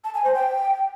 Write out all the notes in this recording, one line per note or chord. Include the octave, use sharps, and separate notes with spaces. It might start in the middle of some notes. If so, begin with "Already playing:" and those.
A5
G#5
C5
G5